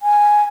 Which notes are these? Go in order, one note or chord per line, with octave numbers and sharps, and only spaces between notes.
G#5